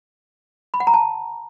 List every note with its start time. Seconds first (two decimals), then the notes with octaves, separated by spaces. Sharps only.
0.74 B5
0.80 F#5
0.87 A#5
0.94 A5